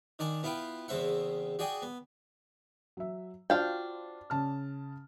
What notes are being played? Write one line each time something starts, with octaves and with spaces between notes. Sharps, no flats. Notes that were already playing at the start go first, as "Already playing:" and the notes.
D#3 D4 D5 G#5
B3 E4 F4 B4 G5
E2 C#3 C4 E5 F#5
F#4 G#4 D5 G5 G#5
B3
F#3 E5
D4 F4 F#4 C5 F5 G5
C#3 A5 F6